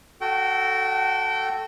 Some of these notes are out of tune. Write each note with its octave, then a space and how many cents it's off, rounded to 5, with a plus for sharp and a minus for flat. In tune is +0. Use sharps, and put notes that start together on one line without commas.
F#4 +0 A4 +0 G5 -30